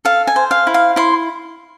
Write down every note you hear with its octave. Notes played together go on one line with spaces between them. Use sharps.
A4 F5
G#5
C5
F5
E4
F5
E4 C6